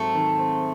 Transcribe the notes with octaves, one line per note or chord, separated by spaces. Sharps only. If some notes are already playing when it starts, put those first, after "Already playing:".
Already playing: G#2 F#3 A3 C4
D#3
C4